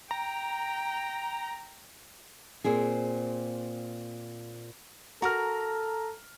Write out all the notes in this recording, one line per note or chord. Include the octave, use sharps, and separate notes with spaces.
G5 A#5
A#2 C4 G#4
F#4 A4 A#4 A#5 F6